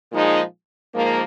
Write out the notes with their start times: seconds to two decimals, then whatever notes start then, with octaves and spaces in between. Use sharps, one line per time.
0.12 A#2 F3 G#3 D#4 G#4
0.94 G#2 F3 A#3